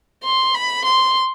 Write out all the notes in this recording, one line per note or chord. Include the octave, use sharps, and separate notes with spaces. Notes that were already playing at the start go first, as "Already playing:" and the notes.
C6
B5
C6